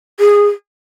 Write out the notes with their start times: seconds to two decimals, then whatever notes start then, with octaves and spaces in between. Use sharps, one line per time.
0.20 G#4